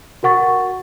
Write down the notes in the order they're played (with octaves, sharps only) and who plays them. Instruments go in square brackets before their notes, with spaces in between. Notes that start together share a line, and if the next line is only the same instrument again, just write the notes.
[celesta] F#4 A#4 F#5 C#6 A6